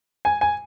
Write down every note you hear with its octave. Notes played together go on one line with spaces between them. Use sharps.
G#5
G#5